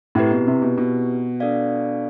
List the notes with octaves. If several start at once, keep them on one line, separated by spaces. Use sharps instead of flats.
A2 C4 E4 G4 B4
B2
C3
B2
B2
D4 A4 D5 F5